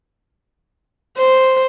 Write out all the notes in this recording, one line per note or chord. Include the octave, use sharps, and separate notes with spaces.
C5